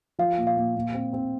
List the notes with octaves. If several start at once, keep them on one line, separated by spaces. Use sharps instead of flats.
F3 F5
A#2
F5
A#2
A#2
C4
C4